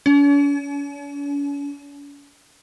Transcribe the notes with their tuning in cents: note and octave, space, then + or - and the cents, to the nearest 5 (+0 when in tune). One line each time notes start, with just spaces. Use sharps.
C#4 +45